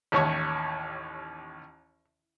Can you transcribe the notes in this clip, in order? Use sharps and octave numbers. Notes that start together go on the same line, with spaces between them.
A1 D#2 C#5 C#6